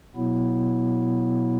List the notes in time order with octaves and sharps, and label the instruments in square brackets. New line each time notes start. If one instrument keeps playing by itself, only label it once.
[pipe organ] B2 F#3 B3 E4